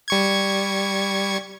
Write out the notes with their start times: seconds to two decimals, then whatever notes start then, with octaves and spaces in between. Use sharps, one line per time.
0.08 G3 C#6 G#6